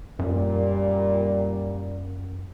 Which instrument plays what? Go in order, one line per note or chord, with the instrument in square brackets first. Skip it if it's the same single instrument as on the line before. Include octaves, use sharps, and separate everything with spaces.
[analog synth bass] F#2 [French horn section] A#2 G3